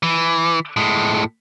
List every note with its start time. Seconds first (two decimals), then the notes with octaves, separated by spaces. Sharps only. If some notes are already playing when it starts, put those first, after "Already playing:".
0.03 E3
0.77 A2 G#3